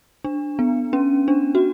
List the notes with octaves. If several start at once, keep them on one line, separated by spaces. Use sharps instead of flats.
D4
B3
C#4
D4
F#4